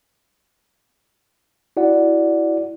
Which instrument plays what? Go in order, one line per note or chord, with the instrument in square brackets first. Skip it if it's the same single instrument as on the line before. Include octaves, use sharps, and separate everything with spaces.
[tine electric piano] E4 F#4 D5 F#5